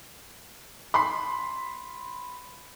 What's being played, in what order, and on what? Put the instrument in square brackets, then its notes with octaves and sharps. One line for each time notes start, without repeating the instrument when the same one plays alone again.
[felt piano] B5 C6